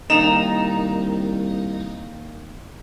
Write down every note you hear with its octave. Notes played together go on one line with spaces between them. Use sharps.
C2 D#3 A#3 C4 D#4 E7 F7